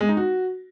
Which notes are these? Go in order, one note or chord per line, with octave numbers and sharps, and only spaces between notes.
G#3
D#4
F#4